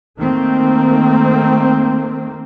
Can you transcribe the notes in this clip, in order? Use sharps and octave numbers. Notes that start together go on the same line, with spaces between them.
D#3 A3 A#3 C4